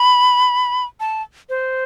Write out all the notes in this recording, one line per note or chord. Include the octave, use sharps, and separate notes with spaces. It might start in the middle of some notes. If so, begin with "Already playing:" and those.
Already playing: B5
A5
C5